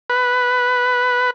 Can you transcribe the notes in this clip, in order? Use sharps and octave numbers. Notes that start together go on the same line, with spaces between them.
B4